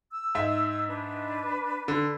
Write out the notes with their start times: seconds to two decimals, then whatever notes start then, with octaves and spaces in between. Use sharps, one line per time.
0.10 E6
0.35 G#2 E5
0.88 D4 B4
1.88 D3